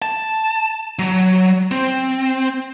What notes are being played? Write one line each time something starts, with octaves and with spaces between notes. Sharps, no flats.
A5
F#3
C4